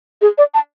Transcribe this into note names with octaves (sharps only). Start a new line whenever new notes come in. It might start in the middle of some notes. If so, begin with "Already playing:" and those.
G#4
D5
A5